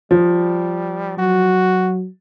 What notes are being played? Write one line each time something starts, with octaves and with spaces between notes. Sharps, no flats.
F3 G3
F#3 F#4